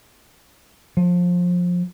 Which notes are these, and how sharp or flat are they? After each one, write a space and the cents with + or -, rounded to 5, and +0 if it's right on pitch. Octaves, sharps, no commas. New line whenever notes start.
F3 +20